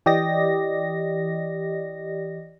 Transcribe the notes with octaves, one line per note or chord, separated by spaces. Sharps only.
E3 G4 D5 D#5 A#6